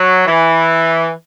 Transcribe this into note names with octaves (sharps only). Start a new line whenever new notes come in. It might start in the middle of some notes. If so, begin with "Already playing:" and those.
Already playing: F#3
E3